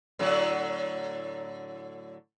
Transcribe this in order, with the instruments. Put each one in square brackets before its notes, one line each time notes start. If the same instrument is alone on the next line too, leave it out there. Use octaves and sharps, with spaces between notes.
[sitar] A2 D3 F#3